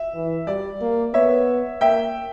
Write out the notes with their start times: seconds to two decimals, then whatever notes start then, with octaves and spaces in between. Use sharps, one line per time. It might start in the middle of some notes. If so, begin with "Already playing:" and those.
Already playing: E5
0.14 E3
0.47 G3 D5
0.81 A#3
1.14 B3 C#5 E5
1.81 A#3 E5 G5